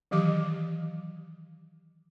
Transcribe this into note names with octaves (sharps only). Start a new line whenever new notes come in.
D#3 E3 F#3 G4 D6